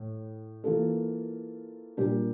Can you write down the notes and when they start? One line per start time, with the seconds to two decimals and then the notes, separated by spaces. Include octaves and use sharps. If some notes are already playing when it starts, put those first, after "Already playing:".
Already playing: A2
0.64 E3 A#3 F4 A4
1.97 A#2 G3 D4 G4 A#4